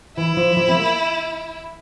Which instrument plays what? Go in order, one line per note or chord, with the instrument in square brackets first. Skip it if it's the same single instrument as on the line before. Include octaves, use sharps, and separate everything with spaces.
[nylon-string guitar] E3 [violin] E4
[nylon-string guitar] F3
F3
C4
A#3